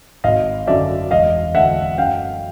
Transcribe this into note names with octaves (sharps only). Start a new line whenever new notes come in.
G#1 D#5 F5
F#2 D3 F#3 D5 E5
E1 D#5 F5
D2 D3 E5 F#5
F#2 F5 G5